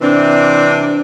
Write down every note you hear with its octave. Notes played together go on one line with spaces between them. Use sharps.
C3 E3 C4 D4